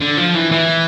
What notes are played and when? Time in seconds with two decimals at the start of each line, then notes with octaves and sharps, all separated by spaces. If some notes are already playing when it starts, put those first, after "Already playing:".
0.01 D3
0.17 F3
0.35 E3
0.51 E3